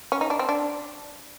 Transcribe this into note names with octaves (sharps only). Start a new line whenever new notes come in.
C#4
D#4
D4
C4
D4